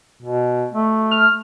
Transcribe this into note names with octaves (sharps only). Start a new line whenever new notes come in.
B2
A3
F6